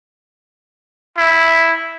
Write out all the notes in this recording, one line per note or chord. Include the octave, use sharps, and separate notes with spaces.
E4